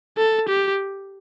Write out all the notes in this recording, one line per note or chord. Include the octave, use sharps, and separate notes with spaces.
A4
G4